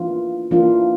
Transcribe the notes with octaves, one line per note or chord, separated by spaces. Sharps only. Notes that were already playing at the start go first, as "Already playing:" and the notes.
Already playing: E3 A#3 D4 F4
E3 A#3 D4 F4